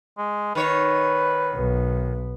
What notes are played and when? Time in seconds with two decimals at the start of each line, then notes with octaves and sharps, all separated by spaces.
0.18 G#3
0.55 D#3 B4 C#5
1.55 B1 B3